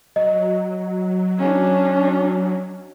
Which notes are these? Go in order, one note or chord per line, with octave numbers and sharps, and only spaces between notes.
F#3 D#5
C#4 D4